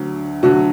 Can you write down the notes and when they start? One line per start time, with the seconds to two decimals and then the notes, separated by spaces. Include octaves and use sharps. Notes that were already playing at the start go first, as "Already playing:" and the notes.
Already playing: D2 D3 F#3
0.43 D2 D3 F#3 F#4